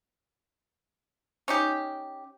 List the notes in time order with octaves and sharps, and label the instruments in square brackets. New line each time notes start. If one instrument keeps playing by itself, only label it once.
[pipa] C#4 D#4 G4